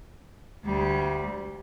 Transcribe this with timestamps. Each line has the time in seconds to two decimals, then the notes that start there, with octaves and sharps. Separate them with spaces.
0.66 D2 G3